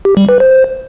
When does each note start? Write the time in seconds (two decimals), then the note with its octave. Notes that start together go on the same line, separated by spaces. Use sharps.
0.05 G4
0.17 G3
0.29 B4
0.40 C5